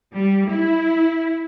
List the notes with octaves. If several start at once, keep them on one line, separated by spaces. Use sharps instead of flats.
G3
E4